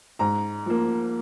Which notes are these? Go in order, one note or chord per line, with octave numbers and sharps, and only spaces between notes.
G#2 A#5
F3 A#3